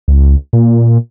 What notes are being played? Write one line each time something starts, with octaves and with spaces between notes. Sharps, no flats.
C#2
A#2